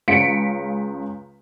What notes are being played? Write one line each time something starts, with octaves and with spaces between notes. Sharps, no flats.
C#2 C#3 F5 B6 C#7 D7